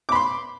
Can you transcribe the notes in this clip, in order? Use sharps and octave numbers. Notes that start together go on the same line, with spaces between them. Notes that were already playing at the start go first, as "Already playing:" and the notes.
B5 C6 D6